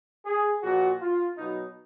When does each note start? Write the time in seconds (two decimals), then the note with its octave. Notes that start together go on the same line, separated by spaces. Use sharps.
0.26 G#4
0.63 A#2 F3 F#4
1.00 F4
1.37 B2 F#3 D#4